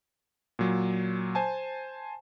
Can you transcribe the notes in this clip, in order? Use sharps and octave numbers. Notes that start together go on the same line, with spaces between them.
A#2 F#3
C5 G#5 A5